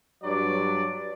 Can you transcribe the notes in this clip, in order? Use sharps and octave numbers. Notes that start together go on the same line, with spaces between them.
G2 F#3 D5